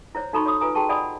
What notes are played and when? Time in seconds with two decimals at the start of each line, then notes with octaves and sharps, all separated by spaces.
0.15 E4 C5 C#5
0.33 D#4 F#4 A4 A#5 B5 C#6
0.46 C#5 C6 D6 D#6
0.60 F4 B4 G#5 A#5 D#6
0.75 F#4 G#4 G5 A5 C#6
0.89 D5 D#5 F#5 G#5 B5 D#6